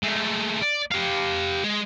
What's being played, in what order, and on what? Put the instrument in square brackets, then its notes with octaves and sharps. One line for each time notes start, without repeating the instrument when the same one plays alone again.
[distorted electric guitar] G#3 A3
D5
G4 F5
G#3